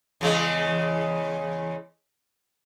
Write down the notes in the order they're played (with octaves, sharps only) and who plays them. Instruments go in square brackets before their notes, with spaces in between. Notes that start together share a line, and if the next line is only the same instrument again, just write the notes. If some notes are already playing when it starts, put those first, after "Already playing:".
[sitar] E2 C#3 G#3